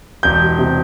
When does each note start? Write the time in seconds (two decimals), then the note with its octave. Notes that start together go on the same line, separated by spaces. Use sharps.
0.23 E1 G6
0.42 G3
0.59 C3